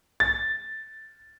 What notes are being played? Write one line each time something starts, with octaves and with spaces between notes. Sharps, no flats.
A6